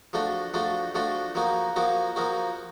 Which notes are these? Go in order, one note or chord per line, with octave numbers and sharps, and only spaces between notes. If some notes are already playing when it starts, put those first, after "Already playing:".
F3 A3 D4 F#4
F3 A3 D4 F#4
F3 A3 D4 F#4
F3 A#3 D#4 F#4
F3 A#3 D#4 F#4
F3 A#3 D#4 F#4